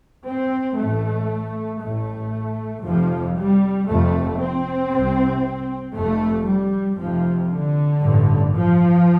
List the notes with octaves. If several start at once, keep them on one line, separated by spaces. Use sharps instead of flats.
C4
A1 A2 A3
A1 A2 A3
F1 F2 C3 F3
G3
F1 F2 C3 A3
C4
C2 C3
F1 F2 C3 A3
G3
F1 F2 C3 F3
D3
A1 G2
F3